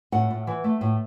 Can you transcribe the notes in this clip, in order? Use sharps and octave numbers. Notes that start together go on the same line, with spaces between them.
A2 F#5
A2
E3
A3
A2